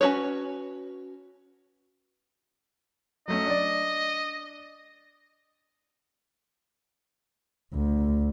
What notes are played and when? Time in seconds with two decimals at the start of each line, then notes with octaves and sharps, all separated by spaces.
0.01 C#4 D#4 F#4 B4 C#5
3.28 F#3 A3 C#4 D#5
3.46 D4 D5
7.74 D2